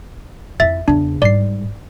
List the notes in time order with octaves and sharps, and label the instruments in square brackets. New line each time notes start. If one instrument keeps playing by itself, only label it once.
[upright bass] F2 E4 [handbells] E5 A6
[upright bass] E2 C#3 [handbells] D4
[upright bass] G#2 G3 [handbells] D5 C7